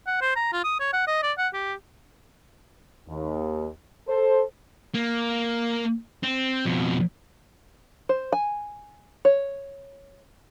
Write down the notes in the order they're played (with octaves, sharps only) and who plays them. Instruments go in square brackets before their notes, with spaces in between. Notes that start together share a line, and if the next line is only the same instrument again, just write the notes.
[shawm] F#5
C5
A#5
F4
D#6
C#5
F#5
D#5
D5
F#5
G4
[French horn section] D#2
A4 C5
[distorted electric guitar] A#3
C4
F2 B2
[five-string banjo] C5
G#5
C#5